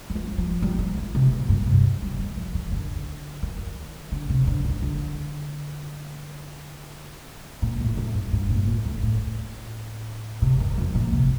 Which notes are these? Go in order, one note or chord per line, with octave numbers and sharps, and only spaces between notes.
F3
G3
F3
G3
F3
D#3
C3
A#2
G2
C3
G3
D#3
F3
D#3
D3
D#3
D3
C3
D3
D#3
D3
A#2
A2
A2
G2
G2
A#2
A2
A2
A2
C3
D#3
F2
A#2
C3